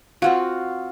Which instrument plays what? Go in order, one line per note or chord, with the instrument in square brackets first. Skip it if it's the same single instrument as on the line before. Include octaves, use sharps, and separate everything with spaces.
[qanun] C4 F4 F#4 [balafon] F5 F#5